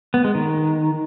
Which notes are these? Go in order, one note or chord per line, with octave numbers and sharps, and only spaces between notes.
B3
G#3
D#3